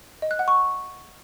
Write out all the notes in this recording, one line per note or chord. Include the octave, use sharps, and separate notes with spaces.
D#5
F#6
F#5
C#6